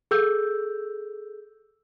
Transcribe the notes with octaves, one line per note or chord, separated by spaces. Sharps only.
G#4 A4 E6 G6